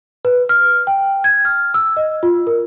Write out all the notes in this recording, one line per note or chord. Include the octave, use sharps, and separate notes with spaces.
B4
F6
G5
G#6
F6
E6
D#5
F4
A#4